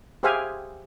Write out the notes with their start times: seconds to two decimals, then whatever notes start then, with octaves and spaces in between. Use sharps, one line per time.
0.23 G4 G#4 C5 E5 F5 G#5